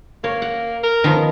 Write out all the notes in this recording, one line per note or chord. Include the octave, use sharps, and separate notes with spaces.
A#3 C#5
F#5
A#4
D#3 F3 B3